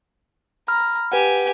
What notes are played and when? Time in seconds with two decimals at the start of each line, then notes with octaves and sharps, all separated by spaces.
0.68 A#5 B5 F6
1.12 G4 B4 F#5 G#5